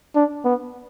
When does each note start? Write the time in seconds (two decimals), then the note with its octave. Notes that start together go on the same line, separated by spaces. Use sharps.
0.15 D4
0.45 B3